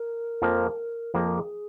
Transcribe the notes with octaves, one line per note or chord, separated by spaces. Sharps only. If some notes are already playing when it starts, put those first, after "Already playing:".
Already playing: A#4
F2 F3 A#3
F2 F3 A#3 G#4
A#4
G#4